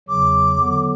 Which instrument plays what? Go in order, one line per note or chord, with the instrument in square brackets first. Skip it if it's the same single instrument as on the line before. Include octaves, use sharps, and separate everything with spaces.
[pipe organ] E2 C#3 F#3 [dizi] D6
[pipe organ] D3 F#3 B3